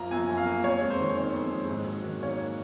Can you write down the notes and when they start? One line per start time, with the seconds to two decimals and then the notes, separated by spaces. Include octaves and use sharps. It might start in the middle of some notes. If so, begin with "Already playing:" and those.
Already playing: F#2 F3 A#3 A#5
0.11 F#2 G#5
0.30 F#2
0.37 F5
0.46 A#3
0.64 F2 C#5
0.81 G#3
0.90 C5
1.00 D#3
1.16 F2 C#5
1.34 F2
1.52 G#3
1.70 G#2
1.87 F#3
2.04 D#3
2.23 A#3 C#5